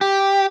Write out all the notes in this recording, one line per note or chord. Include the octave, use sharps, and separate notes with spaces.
G4